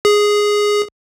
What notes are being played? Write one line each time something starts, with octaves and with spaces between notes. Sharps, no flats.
G#4